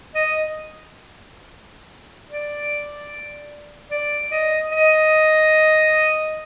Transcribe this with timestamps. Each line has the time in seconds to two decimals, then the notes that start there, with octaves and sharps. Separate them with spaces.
0.15 D#5
2.30 D5
3.91 D5
4.32 D#5
4.72 D#5